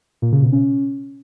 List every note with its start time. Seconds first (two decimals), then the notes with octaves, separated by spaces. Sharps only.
0.22 A#2
0.32 C#3
0.42 B2
0.52 C#4